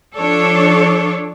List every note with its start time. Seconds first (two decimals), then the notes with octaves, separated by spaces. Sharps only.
0.15 F3 D4 A4 C#5